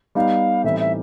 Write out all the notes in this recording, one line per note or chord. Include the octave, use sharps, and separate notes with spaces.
G3 B3 D#4 F5
A2 E3 G3 C4 D#4 E5
E5